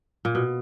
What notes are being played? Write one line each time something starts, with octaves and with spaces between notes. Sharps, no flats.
A#2
B2